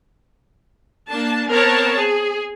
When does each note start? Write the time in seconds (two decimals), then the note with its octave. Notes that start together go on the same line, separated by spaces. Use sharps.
1.11 A#3 D4 A5
1.50 B3 C4 A#4 C#5 A5
1.97 G#4